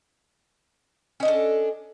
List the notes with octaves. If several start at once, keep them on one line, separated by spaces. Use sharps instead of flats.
C#4 D4 A4 D#5